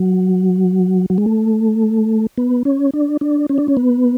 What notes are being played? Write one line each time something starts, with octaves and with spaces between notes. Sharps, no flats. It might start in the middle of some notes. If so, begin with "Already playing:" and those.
Already playing: F#3
F#3
G#3
A3
B3
C#4
D4
D4
C#4
D4
C#4
B3